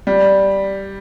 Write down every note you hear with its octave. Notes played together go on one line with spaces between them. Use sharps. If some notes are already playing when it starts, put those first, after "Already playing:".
G3